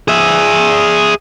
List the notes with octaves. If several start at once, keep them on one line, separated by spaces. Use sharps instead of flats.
G#4 E5